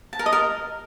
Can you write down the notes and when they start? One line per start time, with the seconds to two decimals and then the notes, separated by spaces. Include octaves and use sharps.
0.13 A5
0.19 A#4
0.26 D#5
0.33 A#4